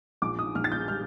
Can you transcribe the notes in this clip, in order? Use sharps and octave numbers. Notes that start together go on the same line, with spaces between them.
A#1 D6
D#6
A#1 F6
A6
G6
G3 F6